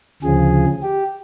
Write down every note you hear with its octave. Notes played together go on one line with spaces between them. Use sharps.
D2 C#3 F3 G#4
G4